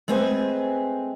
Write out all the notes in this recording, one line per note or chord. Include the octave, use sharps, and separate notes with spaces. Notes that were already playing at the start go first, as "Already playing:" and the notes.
G#3 A3 C4 B4 G#5